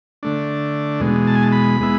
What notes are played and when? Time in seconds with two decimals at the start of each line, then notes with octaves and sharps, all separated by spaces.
0.23 D3 A3 D4
1.00 E2 B2 G#3
1.27 A5
1.35 G#5
1.43 A5
1.52 B5
1.81 G#3 B3 E4